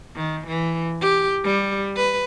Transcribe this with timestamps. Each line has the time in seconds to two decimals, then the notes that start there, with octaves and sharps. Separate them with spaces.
0.16 D#3
0.47 E3
1.01 G4
1.44 G3
1.96 B4